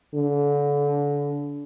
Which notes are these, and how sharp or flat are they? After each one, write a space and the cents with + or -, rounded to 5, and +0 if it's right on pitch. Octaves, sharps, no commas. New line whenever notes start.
D3 -30